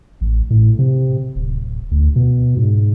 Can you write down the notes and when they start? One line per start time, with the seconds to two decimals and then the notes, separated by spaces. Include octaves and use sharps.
0.21 A1
0.50 A2
0.79 C3
1.36 D1
1.91 D2
2.16 B2
2.57 G#2